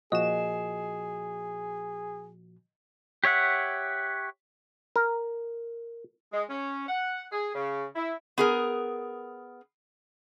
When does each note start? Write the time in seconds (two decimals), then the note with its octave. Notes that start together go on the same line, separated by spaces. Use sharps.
0.12 A#2 F3 F#4 G#4 D#5 E7
3.24 G4 C#5 E5 F#5
4.96 A#4
6.33 G#3
6.50 C#4
6.88 F#5
7.32 G#4
7.55 C#3
7.96 E4
8.38 B3 G#4 A#4